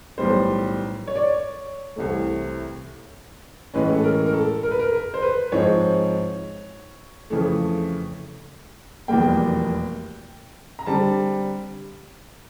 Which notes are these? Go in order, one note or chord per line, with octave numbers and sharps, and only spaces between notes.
B1 A2 E3 G3 B3 C5
C#5
D5
C#5
C2 C3 E3 A3
A1 A2 E3 G#3 C#4 B4
A4
A#4
A#4
A4
A#4
B4
A#4
A#4
C5
B4
G#2 F3 G#3 C4 C#5
F2 C#3 E3 A3
F1 E2 B2 G3 A#3 G5
A#5
D3 G3 C4 A5